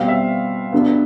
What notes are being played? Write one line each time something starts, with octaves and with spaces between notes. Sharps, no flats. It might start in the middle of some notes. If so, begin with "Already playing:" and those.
Already playing: B2 G3 C4 F5
E5
G2 D3 F#3 B3